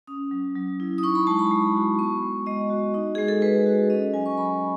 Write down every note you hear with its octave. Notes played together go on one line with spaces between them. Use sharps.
C#4 D#6
F#3
F#3
E4
D#6
D#4 C#6
B5
G#3 A5
B5
G#3
F#4
B3 C#6
G#3
G#3 D#5
F#4
D#4
G#3 G#4
A4
G#3 B4
F#4
C#4 D#5
F#3 G#5
C#6
F#3 B5